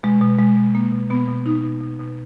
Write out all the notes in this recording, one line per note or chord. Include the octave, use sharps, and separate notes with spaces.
B2 G#3
B2
B2 G#3
B2
B2 A#3
B2
B2 B3
B2
B2 D#4
B2
B2
B2